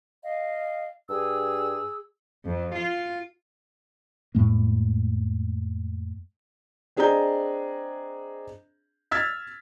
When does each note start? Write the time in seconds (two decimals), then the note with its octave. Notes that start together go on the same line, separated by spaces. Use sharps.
0.23 D#5 F5
1.09 G2 G#4 E6
2.45 F2
2.74 F4
4.35 F2 A2 G#3 A#3
6.97 C4 D4 G#4 D#5 A#5 G6
9.11 E6 F6 G#6 A6 B6